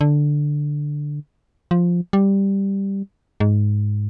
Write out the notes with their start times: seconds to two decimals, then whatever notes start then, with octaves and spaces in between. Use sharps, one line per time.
0.01 D3
1.71 F3
2.13 G3
3.40 G#2